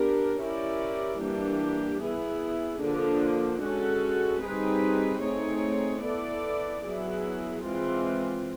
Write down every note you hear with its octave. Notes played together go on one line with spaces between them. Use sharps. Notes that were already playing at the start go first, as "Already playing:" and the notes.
Already playing: B3 D4 G4 A#4
C#4 E4 G4 A#4 D5
E3 G3 A#3 D4 G4
B3 E4 G#4
D3 F3 A#3 D4
G#3 C#4 F#4 A4
G3 C4 D#4 G#4 B4
A3 C4 D#4 G#4 C#5
B3 E4 A4 D5
F#3 B3 E4 G#4
E3 G#3 C4 F4